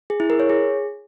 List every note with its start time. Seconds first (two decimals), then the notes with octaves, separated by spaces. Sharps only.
0.10 G#4
0.20 E4
0.30 A#4
0.40 C#5
0.49 G#4